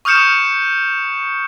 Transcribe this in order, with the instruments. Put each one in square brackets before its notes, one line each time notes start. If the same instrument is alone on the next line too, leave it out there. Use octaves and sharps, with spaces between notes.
[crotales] C#6 D#6 F6 G6 C#7 E7